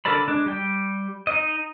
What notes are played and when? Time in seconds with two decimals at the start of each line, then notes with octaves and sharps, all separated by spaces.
0.05 D3 A4 A#4 D5 B5
0.28 G#3 D4
0.46 G3 G5
1.27 D#4 D#5